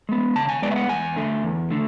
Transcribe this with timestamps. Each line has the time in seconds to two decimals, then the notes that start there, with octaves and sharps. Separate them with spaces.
0.09 G#3 B3
0.35 C#3 A5
0.49 G#5
0.62 G#3 B3 D5
0.71 E5
0.76 F#5
0.89 E2 G#5
1.16 D3 A3
1.43 E2
1.71 D3 A3